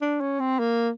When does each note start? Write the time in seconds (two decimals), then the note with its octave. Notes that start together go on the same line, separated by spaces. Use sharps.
0.01 D4
0.21 C#4
0.40 C4
0.59 A#3